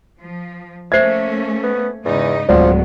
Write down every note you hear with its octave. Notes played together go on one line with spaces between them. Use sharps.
F3
A3 A#3 C#4 C5 E5 G#6 C7
B3
E2 G#2 C#3 D#4
D1 B2 F3 F#3 G#3 D5 F#5